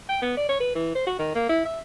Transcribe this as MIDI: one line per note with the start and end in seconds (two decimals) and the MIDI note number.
0.09 0.18 79
0.22 0.34 59
0.37 0.44 74
0.49 0.58 73
0.60 0.71 71
0.75 0.93 52
0.95 1.07 72
1.07 1.15 66
1.19 1.31 51
1.35 1.48 58
1.49 1.63 64
1.65 1.80 76